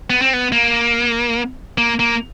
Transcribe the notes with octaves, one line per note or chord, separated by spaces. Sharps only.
B3
C4
B3
A#3
A#3
A#3